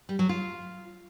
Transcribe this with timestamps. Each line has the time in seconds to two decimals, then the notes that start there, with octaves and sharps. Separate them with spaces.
0.09 G3
0.19 F#3
0.29 F4